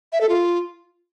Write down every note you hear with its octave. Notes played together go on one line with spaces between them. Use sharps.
E5
A4
F4